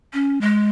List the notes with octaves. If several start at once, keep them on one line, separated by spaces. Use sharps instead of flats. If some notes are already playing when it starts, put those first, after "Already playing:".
C#4
G#3